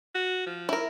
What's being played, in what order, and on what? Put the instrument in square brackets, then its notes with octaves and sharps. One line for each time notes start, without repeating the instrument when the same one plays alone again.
[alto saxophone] F#4
F3
[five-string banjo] E4 A#4